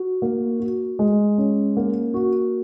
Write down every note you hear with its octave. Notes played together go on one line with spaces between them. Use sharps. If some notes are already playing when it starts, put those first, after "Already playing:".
Already playing: F#4
A#3
F#4
G#3
C#4
A#3
F#4